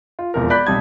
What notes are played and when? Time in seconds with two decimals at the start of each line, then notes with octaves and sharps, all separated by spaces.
0.19 F4
0.34 E1 F2 A#4
0.50 D5 B5 F#6 G6 B6
0.66 B1 C3 G3 A5 D#6 G#6